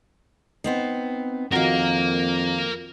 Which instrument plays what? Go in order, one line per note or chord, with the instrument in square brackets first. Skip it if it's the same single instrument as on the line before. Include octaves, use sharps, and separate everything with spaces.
[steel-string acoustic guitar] B3 C4 D#4
[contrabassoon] F2 [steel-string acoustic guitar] D#3 F#4 [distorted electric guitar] A#4 F5